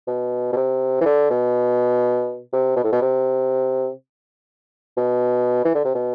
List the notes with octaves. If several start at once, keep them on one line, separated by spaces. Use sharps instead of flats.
B2
B2
C3
E3
D3
B2
C3
B2
A2
B2
C3
B2
E3
D3
C3
B2